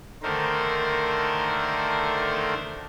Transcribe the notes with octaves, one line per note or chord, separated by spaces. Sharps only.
D3 D#3 A3 A#4 C5